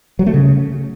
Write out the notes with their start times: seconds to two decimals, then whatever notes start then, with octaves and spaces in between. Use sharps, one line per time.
0.19 F#3
0.27 A3
0.34 C#3